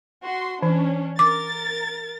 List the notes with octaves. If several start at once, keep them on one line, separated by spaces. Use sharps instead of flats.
F#4 C6
E3 C#4 D4
A#4 D6 A6